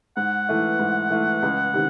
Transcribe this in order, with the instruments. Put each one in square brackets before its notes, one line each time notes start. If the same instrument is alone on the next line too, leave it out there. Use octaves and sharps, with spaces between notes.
[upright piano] G#2 [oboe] F#5
[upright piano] E3 A3
G#2
E3 A3
C#2
C3 D#3